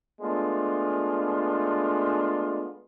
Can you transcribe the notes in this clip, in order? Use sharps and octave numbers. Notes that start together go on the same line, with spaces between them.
G#3 A3 B3 D4 F4